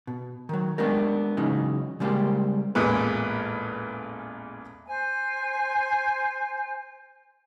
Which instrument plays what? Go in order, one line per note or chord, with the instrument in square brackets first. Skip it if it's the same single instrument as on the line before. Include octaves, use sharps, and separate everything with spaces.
[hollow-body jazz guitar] B2
D#3 F#3
G#3 A3 B3 D4 G4 A#4
C#3 E3 F#3 G#3 C#4 D#4
C#3 G3 G#3 A#3 G4 C5
[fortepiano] A1 E2 A#2 G#3 B4
[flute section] C5 G#5